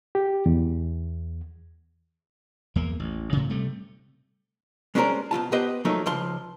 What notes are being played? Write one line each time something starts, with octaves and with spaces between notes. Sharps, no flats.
G4
E2
E2 A#3
A1
A2 C#3
C3 G3 A3
G#3 C#4 D4 F#4 A#4 C5
B2 F3 F4 A5
B3 G4 B4 C5 D#5
F3 F#3 A3 A#3 D#4
C#2 F3 C6